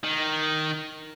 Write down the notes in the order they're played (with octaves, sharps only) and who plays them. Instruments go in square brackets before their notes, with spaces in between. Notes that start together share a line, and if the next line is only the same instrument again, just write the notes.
[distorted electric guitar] D#3